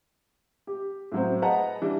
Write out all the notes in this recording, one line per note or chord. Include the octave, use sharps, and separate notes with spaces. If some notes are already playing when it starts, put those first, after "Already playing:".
G4
A2 F#3 C4
G#4 B4 D#5 F#5 A5 A#5
E3 G3 D4